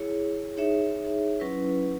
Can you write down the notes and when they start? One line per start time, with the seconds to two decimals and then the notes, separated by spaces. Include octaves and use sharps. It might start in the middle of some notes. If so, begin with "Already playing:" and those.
Already playing: E4 G#4 C#5
0.57 D#4 G#4 C#5 E5
1.40 F#3 C#4 E4 B4